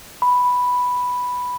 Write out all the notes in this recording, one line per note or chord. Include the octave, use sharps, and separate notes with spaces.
B5